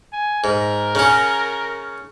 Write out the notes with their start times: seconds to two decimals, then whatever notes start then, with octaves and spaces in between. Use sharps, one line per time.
0.13 G#5
0.44 G#2 A#4
0.95 C#3 C#4